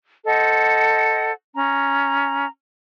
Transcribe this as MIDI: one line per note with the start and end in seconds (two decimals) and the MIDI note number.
0.26 1.31 69
0.26 1.31 72
0.26 1.31 75
0.26 1.31 78
1.53 2.47 61
1.53 2.47 82